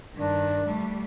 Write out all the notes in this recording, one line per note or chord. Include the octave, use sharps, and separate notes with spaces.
G2 D#3 D4
G3 A3